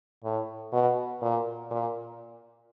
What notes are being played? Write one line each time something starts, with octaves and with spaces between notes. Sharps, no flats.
A2
B2
A#2
A#2